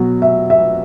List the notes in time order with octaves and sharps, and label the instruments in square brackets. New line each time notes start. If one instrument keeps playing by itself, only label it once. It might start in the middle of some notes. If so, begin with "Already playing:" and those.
Already playing: [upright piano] B2 F#3
E5
E5